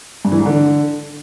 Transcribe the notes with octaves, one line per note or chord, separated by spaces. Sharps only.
G2
E3
G#2
D3